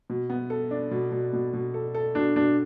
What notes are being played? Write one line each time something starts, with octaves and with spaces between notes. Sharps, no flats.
B2
B3
A4
D4
B2
B2
B2
B2
A4
A4
B2 D4
B2 D4